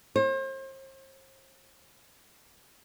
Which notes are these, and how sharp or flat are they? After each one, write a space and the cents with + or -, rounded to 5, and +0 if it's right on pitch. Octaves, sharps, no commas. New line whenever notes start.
C5 +40